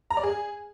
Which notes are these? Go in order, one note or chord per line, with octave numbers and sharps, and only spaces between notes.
A#5
D5
G#4